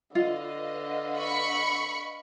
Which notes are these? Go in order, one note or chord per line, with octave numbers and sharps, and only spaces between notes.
D3 F4 B4 D#5 F5
B5 C#6 C#7